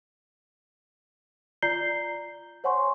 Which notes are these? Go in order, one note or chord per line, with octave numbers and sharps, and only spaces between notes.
F4 D5 A#5 G6 C7 G7
C5 C#5 F#5 G#5 C6 C#6